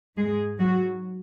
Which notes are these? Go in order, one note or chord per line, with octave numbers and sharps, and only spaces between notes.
G#2 G#3 G#4
F#3 F#4